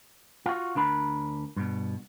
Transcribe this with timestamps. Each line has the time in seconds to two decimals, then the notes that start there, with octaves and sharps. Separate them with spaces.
0.46 F4 F#4
0.75 D2 D4 A#4 B5
1.57 G2 B2